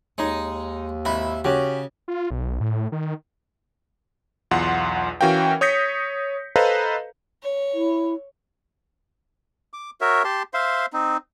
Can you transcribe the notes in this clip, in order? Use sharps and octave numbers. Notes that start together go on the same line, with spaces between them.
D#2 G#3 D#4 C#5
G#1 E4
C#3 C#4 F#4 G4
F4
B1
A2
D#3
B1 E2 F4 F#5 C6
E3 C#4 F#4 A#4 F5 G5
C#5 D#6 G6 A#6 B6 C#7
A4 B4 C5 D#5 F5 A#5
C#5
E4
D6
F#4 A#4 C#5 E5
G4 A5 C6
C5 E5 F5 C6
C4 D#4